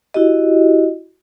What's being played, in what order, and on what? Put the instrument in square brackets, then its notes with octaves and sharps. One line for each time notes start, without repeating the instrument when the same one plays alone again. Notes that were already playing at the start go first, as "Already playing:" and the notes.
[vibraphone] E4 F#4 G4 D#5